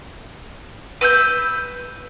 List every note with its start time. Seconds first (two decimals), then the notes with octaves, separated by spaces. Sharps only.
1.01 B4 E6 F6 G6